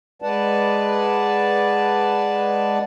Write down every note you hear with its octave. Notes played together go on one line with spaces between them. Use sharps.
G#3 B4 D5 F#5 A5